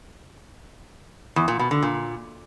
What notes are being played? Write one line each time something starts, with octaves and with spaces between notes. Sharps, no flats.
E2
A#2
B2
D3
A#2